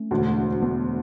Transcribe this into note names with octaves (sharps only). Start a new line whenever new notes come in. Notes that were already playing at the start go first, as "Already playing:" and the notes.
Already playing: A3 C#4
E1 D2 D3
B3 D4